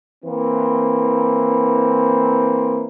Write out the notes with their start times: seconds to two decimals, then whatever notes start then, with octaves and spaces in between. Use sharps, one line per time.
0.25 E3 A#3 C4